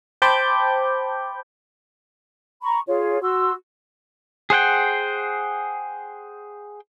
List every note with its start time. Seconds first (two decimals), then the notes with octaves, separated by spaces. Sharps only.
0.22 C5 G5 A5 B5 D6 G6
2.62 A#5 B5 C#6
2.88 F4 G#4 C#5
3.22 F#4 C6 E6
4.50 G#4 C5 F#5 G5